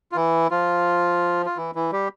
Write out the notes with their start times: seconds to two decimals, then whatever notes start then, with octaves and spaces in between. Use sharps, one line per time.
0.12 F4
0.15 E3 E4
0.51 F3 F4
1.46 F4
1.57 E3 E4
1.75 E3 E4
1.92 G3 G4